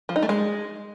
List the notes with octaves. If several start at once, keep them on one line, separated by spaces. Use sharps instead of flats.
F3
D#4
A3
G#3